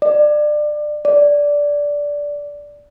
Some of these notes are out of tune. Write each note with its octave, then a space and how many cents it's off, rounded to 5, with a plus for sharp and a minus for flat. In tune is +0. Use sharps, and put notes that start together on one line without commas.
D5 +25
D5 -10